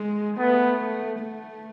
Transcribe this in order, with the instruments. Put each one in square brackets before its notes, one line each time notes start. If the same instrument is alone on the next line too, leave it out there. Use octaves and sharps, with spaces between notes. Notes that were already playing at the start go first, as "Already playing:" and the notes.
Already playing: [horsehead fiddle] G#3
[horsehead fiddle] A3 [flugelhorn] B3
[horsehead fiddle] A3